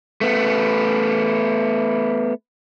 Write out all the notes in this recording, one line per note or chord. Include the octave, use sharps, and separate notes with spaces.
A3 B3